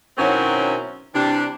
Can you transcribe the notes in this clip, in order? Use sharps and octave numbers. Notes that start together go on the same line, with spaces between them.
B2 D#3 F#3 C4 C#4 E4
C3 E3 G3 D4